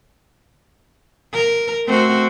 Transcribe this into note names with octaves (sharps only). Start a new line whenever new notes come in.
A#4
A3 C4 F#4